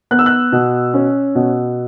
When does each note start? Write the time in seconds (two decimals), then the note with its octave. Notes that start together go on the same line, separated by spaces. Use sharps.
0.11 B3 F#6
0.19 E6
0.26 F#6
0.52 B2
0.94 C#4
1.35 B2